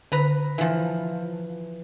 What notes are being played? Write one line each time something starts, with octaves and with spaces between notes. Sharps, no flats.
D3 B4 A#5
E3 F3